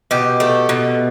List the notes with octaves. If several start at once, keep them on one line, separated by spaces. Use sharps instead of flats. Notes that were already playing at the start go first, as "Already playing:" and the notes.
B2 G4
A3
B2